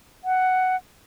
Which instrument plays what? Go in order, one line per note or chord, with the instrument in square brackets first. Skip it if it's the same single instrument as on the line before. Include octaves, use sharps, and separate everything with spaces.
[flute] F#5